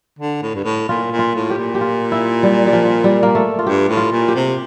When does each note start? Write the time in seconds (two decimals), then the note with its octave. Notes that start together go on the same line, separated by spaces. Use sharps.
0.19 D3
0.42 A2
0.55 G2
0.65 A2
0.89 A#2 F4
1.12 A#2
1.19 F4
1.35 A2
1.50 G4
1.58 A#2
1.75 G4
1.81 F4
2.12 E4
2.43 G3
2.67 G3
2.73 F3
3.04 G3
3.23 A#3
3.35 A3
3.59 F4
3.66 G2 G4
3.89 A2
3.97 F4
4.12 A#2
4.28 G4
4.35 C3